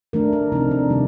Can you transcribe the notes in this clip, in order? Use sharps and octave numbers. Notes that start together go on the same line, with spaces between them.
D#3 A3 D4 A#4
A#4
C3 F3 C4 D#4
D4
C3 D#3 G3 D#4